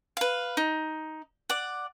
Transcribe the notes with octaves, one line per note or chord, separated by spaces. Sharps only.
B4 F5
D#4
D5 F#5